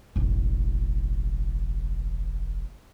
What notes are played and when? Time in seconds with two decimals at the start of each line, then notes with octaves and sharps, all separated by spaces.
0.16 E1 A1